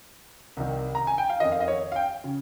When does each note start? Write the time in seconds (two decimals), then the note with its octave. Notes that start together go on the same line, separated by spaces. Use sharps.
0.57 C2 C3 D#3
0.95 A#5
1.07 G#5
1.18 G5
1.30 F5
1.40 F2 D#3 D#5
1.52 F5
1.60 D#5
1.68 C#5
1.92 F5
1.96 G5
2.24 C#3